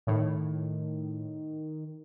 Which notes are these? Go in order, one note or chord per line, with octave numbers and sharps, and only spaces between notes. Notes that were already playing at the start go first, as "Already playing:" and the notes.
A2 D#3